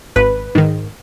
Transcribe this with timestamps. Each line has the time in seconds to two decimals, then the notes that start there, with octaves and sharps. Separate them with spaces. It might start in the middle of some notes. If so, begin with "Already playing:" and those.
0.16 G#1 B4
0.55 G#2 D#3